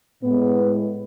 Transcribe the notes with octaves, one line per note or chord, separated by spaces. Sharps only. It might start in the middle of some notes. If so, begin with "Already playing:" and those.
A2 G#3 B3